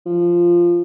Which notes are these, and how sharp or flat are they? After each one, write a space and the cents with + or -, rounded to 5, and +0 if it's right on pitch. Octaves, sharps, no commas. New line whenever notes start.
F3 -10